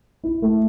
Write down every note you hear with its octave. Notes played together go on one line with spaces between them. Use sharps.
E4
A3